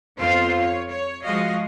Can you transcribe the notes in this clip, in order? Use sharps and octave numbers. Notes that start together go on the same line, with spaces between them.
F2 B3 C4 F4 C5 F5
C#5
C#5
F3 G#3 F#4 D#5 F5